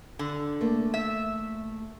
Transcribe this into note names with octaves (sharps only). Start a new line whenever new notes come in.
D3
A3 A#3
E5